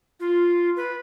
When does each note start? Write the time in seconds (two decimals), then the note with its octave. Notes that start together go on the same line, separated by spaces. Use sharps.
0.20 F4
0.76 B4